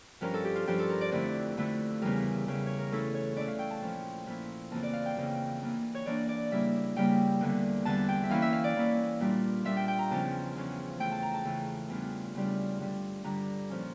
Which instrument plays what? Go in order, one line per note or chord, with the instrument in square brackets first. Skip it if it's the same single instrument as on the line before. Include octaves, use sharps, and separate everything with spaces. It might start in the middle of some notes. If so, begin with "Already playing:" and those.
[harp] G2 F3 C#4 F4 A#4
A4
G4
F4
G2 F3 C#4 F4 G4
A4
A#4
D5
F2 D3 A3 E4 D5
F2 D3 A3 E4
E2 C#3 E3 G3 A#4
E2 C#3 E3 G3
C#5
A#4
E3 A3 C#4 E4 A4
C#5
E3 A3 C#4 E4 D5
F5
G5
A5
A#2 F3 C#4 E4
A#2 F3 C#4 E4
F2 C#3 E3 A#3 A5
D5
F5
G5
F2 C#3 E3 A#3
E3 A#3 D4
C#5
E3 A#3 D4 D5
D5
C#3 G3 A#3 E4 E5
C#3 G3 A#3 E4 G5
E2 D3 G3
E2 D3 G3 A5
G5
E5
E3 A#3 C#4 E4 F5
E5
F5
D5
E3 A#3 C#4 E4
A#2 G3 D4 F4
A#2 G3 D4 F4 E5
G5
G5
A#5
E2 C#3 F3 C#4 A5
E2 C#3 F3 C#4
C#3 E3 A3 G5
A5
A#5
A5
C#3 E3 A3
E2 C#3 G3 D4 F4
E2 C#3 G3 D4 F4
G2 D3 G3
G2 D3 G3 A#5
A#2 F3 C#4